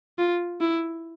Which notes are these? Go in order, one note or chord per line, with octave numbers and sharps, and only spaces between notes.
F4
E4